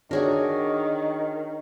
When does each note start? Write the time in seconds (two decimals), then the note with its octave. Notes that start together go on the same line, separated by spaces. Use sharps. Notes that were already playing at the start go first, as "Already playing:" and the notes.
0.11 D#3 D4 F#4 G#4 A#4 C#5 D5